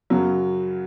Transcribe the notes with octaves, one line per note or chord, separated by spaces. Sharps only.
F#2 C#3 F#3